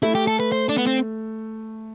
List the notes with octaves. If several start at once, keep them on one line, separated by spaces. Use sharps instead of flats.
A3 E4
G4
A4
B4
C5
D4
B3
C4